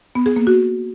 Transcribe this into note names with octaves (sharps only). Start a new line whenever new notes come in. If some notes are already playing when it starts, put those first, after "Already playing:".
B3
G#4
A#3
F#4